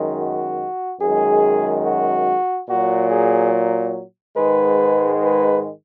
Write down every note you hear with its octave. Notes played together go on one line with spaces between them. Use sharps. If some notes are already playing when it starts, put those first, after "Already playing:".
Already playing: F#2 D#3 G#3
F#4
F#2 D#3 G#3 G#4
F#4
A#2 F#3 F#4
G#4
G#2 D#3 G#3 B4
B4